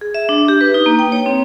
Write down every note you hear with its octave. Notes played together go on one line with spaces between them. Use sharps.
G#4
E5
D4
G4
B4
D#4
A#3
G5
C#5
C4